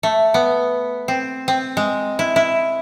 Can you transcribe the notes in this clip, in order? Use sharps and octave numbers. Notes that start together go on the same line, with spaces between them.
A3
B3
C4
C4
G#3
E4
E4